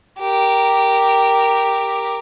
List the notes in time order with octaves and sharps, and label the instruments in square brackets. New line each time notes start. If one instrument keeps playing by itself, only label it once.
[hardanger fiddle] G4 A#4